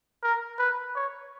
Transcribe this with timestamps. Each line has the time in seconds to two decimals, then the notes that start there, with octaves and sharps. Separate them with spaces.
0.23 A#4
0.58 B4
0.95 C#5